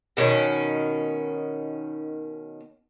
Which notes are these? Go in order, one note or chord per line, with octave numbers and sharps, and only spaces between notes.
B2 D#3 C#4